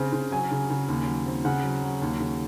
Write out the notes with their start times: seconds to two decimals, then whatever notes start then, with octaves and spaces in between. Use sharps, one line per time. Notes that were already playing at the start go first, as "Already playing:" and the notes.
Already playing: C#3 C4
0.13 C#3
0.31 F#3 G#5
0.51 C#3
0.70 C#3
0.88 D#2
1.07 F#3
1.26 C4
1.45 C#3 F#5
1.63 F#3
1.83 F#3
2.02 D#2
2.20 C#3